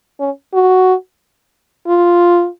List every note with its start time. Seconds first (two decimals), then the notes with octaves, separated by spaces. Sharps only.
0.20 C#4
0.54 F#4
1.87 F4